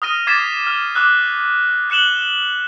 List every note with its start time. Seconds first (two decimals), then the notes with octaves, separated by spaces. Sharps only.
0.02 D#6 F6 A#6 D#7
0.27 D6 G#6 A6 B6 C7 E7
0.67 F6
0.95 D6 E6 F#6
1.90 F#6 C#7 E7 F#7 G7